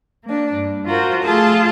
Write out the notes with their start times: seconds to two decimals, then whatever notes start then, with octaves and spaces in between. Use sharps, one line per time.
0.25 A#3 D4
0.53 G2
0.86 F4 F#4 A#4 C5
1.23 A3 F4 G#4 A4 A5